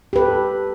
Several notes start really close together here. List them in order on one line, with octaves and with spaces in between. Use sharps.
G4 B4 A4